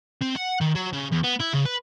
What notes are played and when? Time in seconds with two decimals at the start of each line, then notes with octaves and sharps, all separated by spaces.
0.21 C4
0.36 F#5
0.61 D#3
0.75 F#3
0.93 C#3
1.12 E2
1.24 B3
1.40 E4
1.53 C#3
1.65 B4